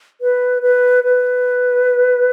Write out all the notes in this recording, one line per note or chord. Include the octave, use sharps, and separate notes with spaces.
B4
B4
B4